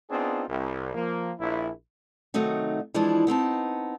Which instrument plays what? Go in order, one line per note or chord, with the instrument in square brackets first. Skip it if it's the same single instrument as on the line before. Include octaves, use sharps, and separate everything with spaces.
[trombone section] B3 C4 D4 D#4 F4 G#4
C2
F3 A#3
A#1 E4
[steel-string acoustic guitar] C3 D#3 F#3 A3 D#4 F#4
E3 F3 G#3 D4 E4 F4
B3 C4 D#4 A5